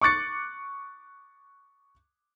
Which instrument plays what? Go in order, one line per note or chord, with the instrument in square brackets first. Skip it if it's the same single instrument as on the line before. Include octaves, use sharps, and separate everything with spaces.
[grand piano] C#6 D6 F#6 A6 C#7